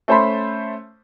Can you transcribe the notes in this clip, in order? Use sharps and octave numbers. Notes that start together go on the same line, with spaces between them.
A3 C#4 C5 A5 B5 C6